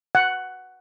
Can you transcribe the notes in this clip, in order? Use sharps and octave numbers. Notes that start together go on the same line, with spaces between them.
F#5